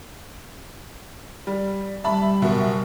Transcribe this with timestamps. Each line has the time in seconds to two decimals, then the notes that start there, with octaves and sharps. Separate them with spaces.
1.47 G3
2.04 G3 E5 A5 B5
2.42 F#1 B2 E5